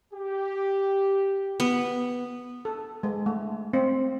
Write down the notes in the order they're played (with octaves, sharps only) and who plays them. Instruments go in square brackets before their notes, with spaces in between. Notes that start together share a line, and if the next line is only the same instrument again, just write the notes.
[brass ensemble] G4
[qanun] B3
[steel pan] A4
G#3
A3
C4